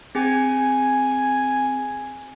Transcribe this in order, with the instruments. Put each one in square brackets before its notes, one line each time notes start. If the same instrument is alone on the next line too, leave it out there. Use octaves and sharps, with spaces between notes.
[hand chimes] C4 G#4 G5 [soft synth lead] G#5